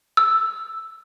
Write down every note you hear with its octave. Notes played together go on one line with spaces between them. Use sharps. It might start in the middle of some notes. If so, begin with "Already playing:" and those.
E6